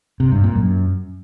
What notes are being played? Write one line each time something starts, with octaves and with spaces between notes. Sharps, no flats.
C3
G2
A#2
F#2